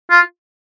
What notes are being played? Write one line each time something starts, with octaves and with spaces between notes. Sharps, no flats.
F4